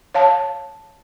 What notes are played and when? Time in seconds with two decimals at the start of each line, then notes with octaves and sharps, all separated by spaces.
0.15 C#5 F5 A5